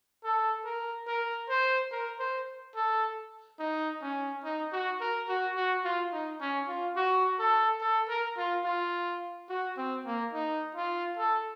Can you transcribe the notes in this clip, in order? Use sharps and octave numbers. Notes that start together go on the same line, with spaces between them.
A4
A#4
A#4
C5
A#4
C5
A4
D#4
C#4
D#4
F#4
A#4
F#4
F#4
F4
D#4
C#4
F4
F#4
A4
A4
A#4
F4
F4
F#4
C4
A#3
D#4
F4
A4